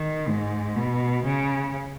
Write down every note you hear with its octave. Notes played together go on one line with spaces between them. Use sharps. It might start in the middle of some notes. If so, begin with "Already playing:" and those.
Already playing: D#3
G#2
B2
C#3